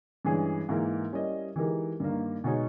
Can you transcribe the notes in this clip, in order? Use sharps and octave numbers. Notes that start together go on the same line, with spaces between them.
G2 E3 G#3 C#4 G#4
G#2 E3 A#3 E4 A#4
G3 C#4 E4 A#4 D#5
E3 G#3 D#4 G4 A#4
G2 D#3 A#3
B2 G#3 D#4 G#4 C#5